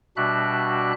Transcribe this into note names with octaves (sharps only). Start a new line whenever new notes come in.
B2 G3 D4 F#4 E5 F#6